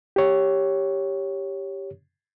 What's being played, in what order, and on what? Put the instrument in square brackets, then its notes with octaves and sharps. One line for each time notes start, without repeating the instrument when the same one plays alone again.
[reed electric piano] G4 C#5